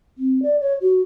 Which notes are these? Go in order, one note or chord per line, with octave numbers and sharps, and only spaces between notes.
C4
D5
C#5
F#4